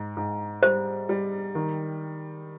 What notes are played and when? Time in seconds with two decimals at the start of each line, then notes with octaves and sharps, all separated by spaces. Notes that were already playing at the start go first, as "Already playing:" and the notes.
Already playing: G#2
0.17 G#2
0.63 G3 C5
1.09 G3
1.55 D#3